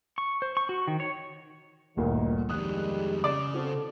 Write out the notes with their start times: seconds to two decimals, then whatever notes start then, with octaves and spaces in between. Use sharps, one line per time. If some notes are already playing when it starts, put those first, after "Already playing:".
0.18 C#6
0.42 C5
0.57 C#6
0.69 F#4
0.87 D#3
1.00 C#5
1.97 G1 D2 A#2 D#3
2.49 F2 D#3 G3 G#3 D#6 F#6
3.24 C#3 D5
3.54 C4 F#4 A4 C5